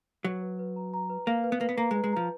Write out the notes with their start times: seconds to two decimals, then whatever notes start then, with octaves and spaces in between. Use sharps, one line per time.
0.24 F#3 B4
0.42 B4
0.59 B4
0.76 A#5
0.94 A#5
1.10 B4
1.27 A#3 F5
1.44 B4
1.52 B3
1.60 A#3 B4
1.69 B3
1.78 A#3 A#5
1.91 G#3
1.96 B4
2.04 G#3
2.13 F3 A#5